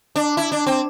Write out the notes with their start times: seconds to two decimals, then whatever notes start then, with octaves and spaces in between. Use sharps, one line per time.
0.16 D4
0.37 E4
0.52 D4
0.66 C4